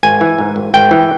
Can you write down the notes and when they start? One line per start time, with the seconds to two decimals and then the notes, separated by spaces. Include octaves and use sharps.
0.03 G#1 G#5
0.21 E3
0.39 G#2
0.56 G#1
0.74 G#1 G5
0.91 E3